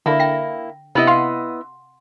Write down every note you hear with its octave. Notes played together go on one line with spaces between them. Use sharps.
D3 A#3 E4
G5 A#6
C3 B3 E4 D#5
F5 F#5 C6